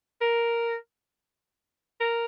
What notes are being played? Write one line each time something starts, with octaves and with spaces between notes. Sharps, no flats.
A#4
A#4